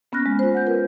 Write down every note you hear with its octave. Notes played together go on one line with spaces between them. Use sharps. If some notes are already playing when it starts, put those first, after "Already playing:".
A#3 B3 C#4 F6 F#6 A#6
G#3
F4 C5
F#5 G6
F4 A#4 B4